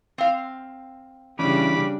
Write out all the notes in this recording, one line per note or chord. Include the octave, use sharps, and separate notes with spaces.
C4 F5
C#3 E3 G3 C#4 D4 B5 D6